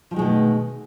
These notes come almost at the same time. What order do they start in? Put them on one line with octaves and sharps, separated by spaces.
F3 D#3 G#3 B2 A3